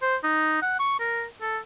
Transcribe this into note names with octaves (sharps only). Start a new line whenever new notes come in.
C5
D#4
F#5
C#6
A#4
A4